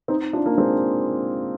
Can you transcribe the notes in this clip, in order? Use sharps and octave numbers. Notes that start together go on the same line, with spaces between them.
C4 D#4
D4 F4
A#3 D4
G#3 C4